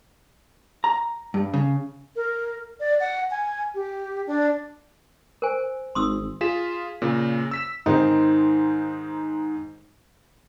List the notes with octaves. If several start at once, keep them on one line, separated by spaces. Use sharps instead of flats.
A#5
G2
C#3
A#4
D5
F#5
G#5
G4
D4
A#4 C5 G#5
G#1 C6 D#6 E6
F4 G#4 B6 E7
A#2 C#3
E6 B6 E7
G#2 D#3 C4 D#4